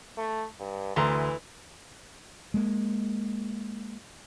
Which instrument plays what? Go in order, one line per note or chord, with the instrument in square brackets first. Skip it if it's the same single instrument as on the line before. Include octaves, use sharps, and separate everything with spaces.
[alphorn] A3
G2
[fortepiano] D2 A#5 C6 [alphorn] E3
[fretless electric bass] G#3 A#3